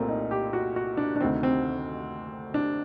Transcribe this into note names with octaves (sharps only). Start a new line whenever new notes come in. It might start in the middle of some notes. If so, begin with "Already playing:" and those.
Already playing: C2 A#2 A3 A#3 C4
D#4
G4
F#4
F#4
D4
D4
D2 C3 D#3 C4
C4
D4